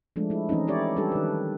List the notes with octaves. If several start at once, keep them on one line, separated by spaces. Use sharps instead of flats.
F3 G#3 A3 D4
A3 E4
E3 A3 C4 C#4 D#4
E4 G4 C#5 D5
G3 D4 G4 A4
D#3 B4